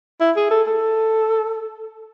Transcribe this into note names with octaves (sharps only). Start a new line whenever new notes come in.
E4
G#4
A4
A4